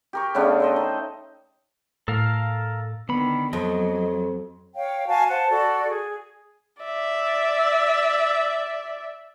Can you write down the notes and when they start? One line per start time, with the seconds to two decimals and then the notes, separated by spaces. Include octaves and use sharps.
0.13 G4 A#4 C#6
0.35 C#3 A3 B3 D4
0.60 A4 C5 D#5
0.76 D#4
2.08 A2 A4 A#4 F5
3.09 D3 D#3 B3 B5
3.53 F2 F#3 D#5
4.75 C#5 F5 G5
5.08 F#4 F5 G#5 A5
5.28 C5 F#5 A5
5.50 F#4 A4 D5
5.89 G#4
6.83 D5 E5